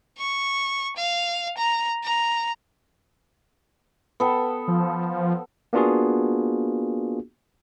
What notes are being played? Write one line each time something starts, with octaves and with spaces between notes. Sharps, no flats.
C#6
F5
A#5
A#5
B3 A4 G5
F3
A#3 B3 D4 F4 F#4 G#4